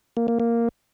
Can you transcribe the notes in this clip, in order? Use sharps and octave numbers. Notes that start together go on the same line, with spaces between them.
A#3
A#3
A#3